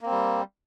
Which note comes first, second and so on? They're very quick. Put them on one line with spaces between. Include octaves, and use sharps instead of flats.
A#3 C4 G3